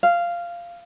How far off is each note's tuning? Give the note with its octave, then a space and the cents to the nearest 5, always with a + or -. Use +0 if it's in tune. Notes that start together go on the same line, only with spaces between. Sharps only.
F5 -10